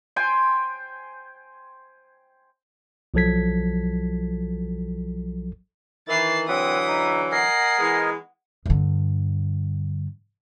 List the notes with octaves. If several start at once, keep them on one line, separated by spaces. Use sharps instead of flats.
C5 G5 G#5 C6
B1 F3 F#3 A4 G#6 B6
D#3 E3 A6 C7
D3 E3 F#3 C4 B4 D#6 B6
D#4
A#4 D#5 F#5 G#5 C7
E3 G#3 B3
G2 D3